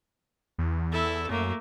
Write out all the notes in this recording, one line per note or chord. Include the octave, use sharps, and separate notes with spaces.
E2
E4 A4
F#2 A3 A#3